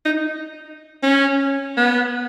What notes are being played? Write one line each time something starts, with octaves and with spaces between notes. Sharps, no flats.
D#4
C#4
B3